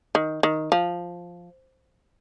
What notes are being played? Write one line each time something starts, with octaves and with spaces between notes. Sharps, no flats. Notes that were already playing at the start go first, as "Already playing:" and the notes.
D#3
D#3
F3